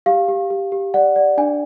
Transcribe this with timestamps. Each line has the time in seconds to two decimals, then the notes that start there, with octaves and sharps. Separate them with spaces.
0.06 G4 F5
0.28 G4
0.50 G4
0.72 G4
0.94 D5 F#5
1.16 D5
1.38 D4 G#5